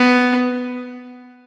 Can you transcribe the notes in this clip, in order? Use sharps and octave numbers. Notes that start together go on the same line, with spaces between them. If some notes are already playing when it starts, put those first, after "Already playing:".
Already playing: B3